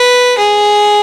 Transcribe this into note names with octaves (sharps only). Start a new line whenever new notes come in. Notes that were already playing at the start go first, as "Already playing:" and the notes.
Already playing: B4
G#4